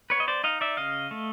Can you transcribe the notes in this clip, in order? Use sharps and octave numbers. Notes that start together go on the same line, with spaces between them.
B3 B4 C#5
D#5
C5 D5
D#4 D#5 F5
D5 E5
C#3 D#5 F5
A3